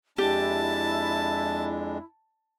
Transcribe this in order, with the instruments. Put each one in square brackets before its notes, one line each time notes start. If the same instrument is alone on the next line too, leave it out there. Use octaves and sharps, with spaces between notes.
[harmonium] F2 G#3 D4 [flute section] E4 [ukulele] G4 [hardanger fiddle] A5